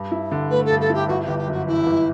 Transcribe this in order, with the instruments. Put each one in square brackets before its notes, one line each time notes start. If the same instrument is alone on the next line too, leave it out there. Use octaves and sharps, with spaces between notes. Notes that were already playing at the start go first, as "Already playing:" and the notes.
Already playing: [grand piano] G2
E4
D3
[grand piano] A3 [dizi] B4
[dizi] A4
[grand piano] G2
[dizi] A4
[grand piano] E4 [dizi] G4
[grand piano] G1 [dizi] F#4
[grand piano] G1 [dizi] G4
[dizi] G4
[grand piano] F#2 [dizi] F#4
[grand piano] E3 [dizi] E4
[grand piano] G1